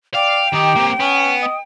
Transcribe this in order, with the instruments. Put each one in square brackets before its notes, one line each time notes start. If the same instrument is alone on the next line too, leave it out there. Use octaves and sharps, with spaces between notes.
[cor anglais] D5 [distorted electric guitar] F5 [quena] G5
[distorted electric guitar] D#3 D#4 [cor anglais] G4
[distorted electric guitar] A#3 C4
[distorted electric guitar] B3 [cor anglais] C#4
[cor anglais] D#5